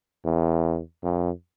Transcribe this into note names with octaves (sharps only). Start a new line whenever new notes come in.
E2
F2